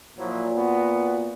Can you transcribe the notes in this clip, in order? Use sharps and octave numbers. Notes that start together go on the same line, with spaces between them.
A#2 F3 F#3 E4
B3 F#4